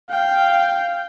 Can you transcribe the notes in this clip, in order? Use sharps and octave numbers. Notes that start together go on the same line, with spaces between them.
F5 G5